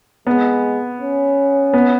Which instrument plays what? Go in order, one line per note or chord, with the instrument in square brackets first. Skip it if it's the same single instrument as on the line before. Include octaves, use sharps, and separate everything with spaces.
[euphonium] G#3 [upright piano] B3
[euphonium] C#4
[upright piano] B3